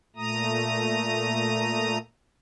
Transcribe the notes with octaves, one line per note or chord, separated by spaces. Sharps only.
A#2 A3 A#5 D#6